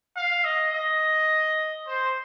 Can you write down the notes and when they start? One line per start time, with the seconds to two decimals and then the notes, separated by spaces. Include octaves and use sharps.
0.17 F5
0.44 D#5
0.73 D#5
1.87 C5